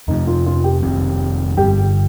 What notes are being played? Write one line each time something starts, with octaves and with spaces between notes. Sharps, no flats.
F2 C3 F3 D#4
F4
F4
G4
F1 F2 D#3 C4
G1 G2 G3 G4